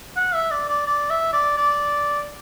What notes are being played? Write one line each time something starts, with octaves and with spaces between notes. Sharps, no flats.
F#5
E5
D5
D5
D5
E5
D5
D5